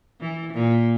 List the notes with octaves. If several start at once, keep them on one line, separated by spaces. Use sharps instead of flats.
E3
A#2